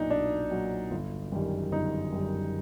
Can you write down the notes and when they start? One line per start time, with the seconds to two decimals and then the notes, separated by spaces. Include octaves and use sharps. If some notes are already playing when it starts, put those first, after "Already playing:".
Already playing: B1 A#2 F#3 D4 D#4
0.10 B1 D4
0.51 A#2 F#3
0.91 G1
1.32 F#2 D#3 G3
1.72 G1 D#4
2.12 F#2 D#3 G3